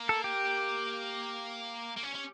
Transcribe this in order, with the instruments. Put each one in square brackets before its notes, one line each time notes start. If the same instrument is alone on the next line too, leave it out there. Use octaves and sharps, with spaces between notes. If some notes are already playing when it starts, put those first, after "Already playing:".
Already playing: [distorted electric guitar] A#3
[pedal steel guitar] A4
G4
[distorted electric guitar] A#3
C#4
C#4